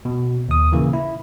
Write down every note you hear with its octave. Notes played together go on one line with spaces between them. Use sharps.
B2
D#2 D#6
A#2 C#3 E3 A#3
E4